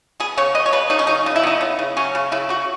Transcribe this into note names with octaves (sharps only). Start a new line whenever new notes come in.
B3 G#4
C#3 C#5
B3 D#5
C#5
C#3 B4
C#3 D#4
C#4
F#3 D#4
C#3 D#4
E4
B3 D#4
C#3 B3
C#3
F#3 C#4
C#3
C#3 E4
C#3 F#4